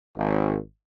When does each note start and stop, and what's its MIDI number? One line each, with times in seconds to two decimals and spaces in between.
0.16 0.57 32